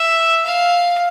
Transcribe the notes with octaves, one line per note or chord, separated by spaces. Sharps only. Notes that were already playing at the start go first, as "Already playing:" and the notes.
Already playing: E5
F5